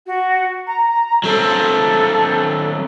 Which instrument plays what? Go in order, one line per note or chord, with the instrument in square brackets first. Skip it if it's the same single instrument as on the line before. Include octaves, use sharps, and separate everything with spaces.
[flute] F#4
A#5
[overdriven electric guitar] F#3 C4 [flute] A4